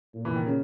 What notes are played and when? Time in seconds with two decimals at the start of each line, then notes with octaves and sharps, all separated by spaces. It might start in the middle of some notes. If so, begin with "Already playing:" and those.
0.14 A#2
0.25 E3
0.36 D#3
0.46 C#3